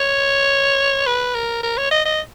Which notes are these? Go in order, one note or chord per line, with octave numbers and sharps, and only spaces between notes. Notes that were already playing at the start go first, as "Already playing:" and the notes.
Already playing: C#5
B4
A#4
A#4
C#5
D#5
D#5